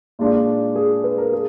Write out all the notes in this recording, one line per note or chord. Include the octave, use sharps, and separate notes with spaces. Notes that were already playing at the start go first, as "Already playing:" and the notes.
A#2 G#3 D4 F4
G#4
B4
A#4
G#4